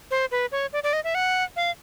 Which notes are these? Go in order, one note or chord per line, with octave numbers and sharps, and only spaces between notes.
C5
B4
C#5
D5
D5
D#5
E5
F#5
F5